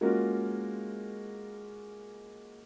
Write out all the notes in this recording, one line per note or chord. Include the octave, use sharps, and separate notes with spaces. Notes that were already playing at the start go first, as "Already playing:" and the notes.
G#3 A#3 C#4 F4 F#4 A#4